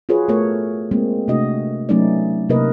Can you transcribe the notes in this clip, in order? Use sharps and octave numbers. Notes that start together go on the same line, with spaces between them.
F4 F#4 G#4 B4 C#5
A3 B3 A4 A#4 C#5
G#3 A#3 C4
C3 A3 D4 F#4 D#5
F#3 A3 B3 C#4 D#4 D5
C3 A#3 D#4 A#4 B4 D#5